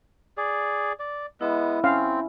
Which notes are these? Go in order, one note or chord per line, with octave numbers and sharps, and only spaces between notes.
G#4 D5
D5
G#3 B3 E4 E5 B5
C4 C#4 F5